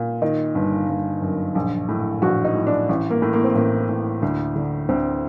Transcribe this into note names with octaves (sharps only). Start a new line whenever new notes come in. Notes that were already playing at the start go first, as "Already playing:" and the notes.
Already playing: A#2
D#3 D#4
G1
G1
F#2
A#1
A2
A#1 F#4
D#4
A2
D4
A1
A#3
A2
A#3
C4
A1 A#3
A2
D2
D3
D2 C4